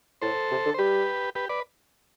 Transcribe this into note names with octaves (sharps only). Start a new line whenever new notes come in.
A2 A4 C5
C3
D3
C5
G3 G4 B4
G4 B4
B4 D5